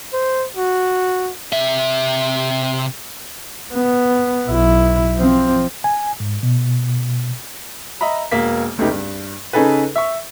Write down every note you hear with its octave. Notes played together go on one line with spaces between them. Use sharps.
C5
F#4
C3 E5
B3
B1 E4
F3 C4
G#5
G#2
B2
D#5 E5 A#5 B5
E1 A#3 B6
F1 C#2 A3 B3 D#4 G4
G2
C#3 C#4 D#4 G#4 A4 B4
E5 C#6